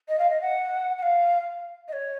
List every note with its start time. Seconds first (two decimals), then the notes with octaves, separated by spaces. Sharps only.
0.08 D#5
0.19 F5
0.30 D#5
0.41 F#5
0.98 F#5
1.02 F5
1.88 D#5
1.93 C#5